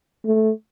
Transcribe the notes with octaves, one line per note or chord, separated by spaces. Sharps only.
A3